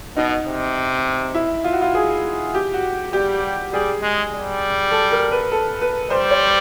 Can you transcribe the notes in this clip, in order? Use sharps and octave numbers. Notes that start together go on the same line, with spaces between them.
B2 D#4
C3
E4
F4
F#4
F4
G#4
G4
F#4
G3 G4
G3 G#4
G#3
G3
A4
A#4
B4
A4
B4
G3 C5
C#5